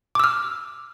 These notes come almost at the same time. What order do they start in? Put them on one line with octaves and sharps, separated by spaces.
D6 E6 F6